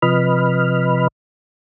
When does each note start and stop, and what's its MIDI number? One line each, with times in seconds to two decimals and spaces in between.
0.02 1.08 48
0.02 1.08 53
0.02 1.08 71
0.02 1.08 75
0.02 1.08 83
0.02 1.08 89